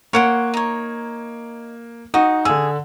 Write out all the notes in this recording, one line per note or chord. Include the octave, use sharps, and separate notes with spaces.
A#3 C#5 F#5 C6 C#7 D7
D#4 C#5
D#4 F#4 D#6
D3 G#4 E6